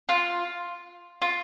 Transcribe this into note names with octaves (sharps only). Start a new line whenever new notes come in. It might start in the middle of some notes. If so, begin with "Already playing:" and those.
F4
F4